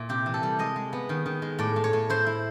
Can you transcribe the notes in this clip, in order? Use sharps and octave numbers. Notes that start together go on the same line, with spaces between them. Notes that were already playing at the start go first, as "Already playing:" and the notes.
Already playing: A#2 E4
C3 G4
E3
A4
G3
G#3 D#5
G#3
B3
D#3
D#3
G#3
A2 D5
A2
C#5
A2
E4 C5
E4